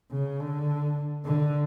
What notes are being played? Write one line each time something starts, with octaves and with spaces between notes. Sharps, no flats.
C#3
D3
D3